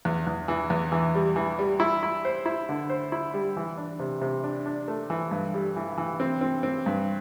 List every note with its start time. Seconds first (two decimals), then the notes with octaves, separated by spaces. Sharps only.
0.05 E2
0.27 E2
0.48 E3
0.70 E2
0.92 E3
1.15 G3
1.36 E3
1.59 G3
1.80 E4
2.03 E4
2.25 C5
2.46 E4
2.69 D3
2.90 C5
3.12 E4
3.34 G3
3.57 E3
3.78 D4
3.99 C3
4.21 C3
4.44 D4
4.66 D4
4.88 A3
5.10 E3
5.31 G2
5.54 G3
5.76 E3
5.97 E3
6.20 C4
6.41 C4
6.63 C4
6.86 G2